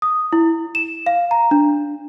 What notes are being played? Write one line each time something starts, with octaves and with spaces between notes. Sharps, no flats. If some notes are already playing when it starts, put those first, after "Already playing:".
D#6
E4
E7
F5
A#5
D4